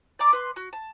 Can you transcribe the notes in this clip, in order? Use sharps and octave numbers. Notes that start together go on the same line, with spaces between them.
D5 A#5 D6
B4 C6
F#4
A5